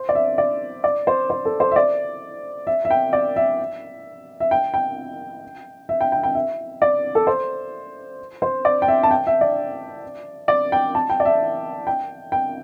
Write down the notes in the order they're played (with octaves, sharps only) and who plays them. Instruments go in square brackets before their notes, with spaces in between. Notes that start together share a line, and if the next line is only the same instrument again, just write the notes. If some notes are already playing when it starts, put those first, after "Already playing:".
Already playing: [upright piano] C5
D5
E5
D5
D5
C5
C5
A4
C5
E5
D5
E5
E5
G5
D5
E5
E5
G5
G5
E5
G5
G5
G5
E5
D5
A4
C5
C5
D5
G5
E5
A5
G5
E5
D5
D5
G5
A5
G5
D5
E5
G5
G5